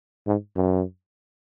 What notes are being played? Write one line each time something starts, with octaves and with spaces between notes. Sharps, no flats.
G#2
F#2